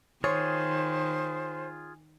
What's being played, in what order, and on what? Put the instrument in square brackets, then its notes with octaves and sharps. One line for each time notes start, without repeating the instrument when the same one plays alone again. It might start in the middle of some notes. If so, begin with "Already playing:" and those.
[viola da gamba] D#3 [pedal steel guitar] F4 G#4 [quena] C5 [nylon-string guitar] C#5